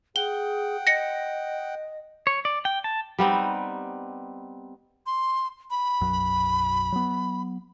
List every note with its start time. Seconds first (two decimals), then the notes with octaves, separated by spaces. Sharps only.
0.16 G#4 F#5 G5 G7
0.87 D#5 A#6 C#7
2.27 C#5
2.45 D5
2.65 G5
2.84 A5
3.19 G3 B3 C4 D#4
5.06 C6
5.71 B5
6.01 B1 F#2 F#3
6.92 F#3 B3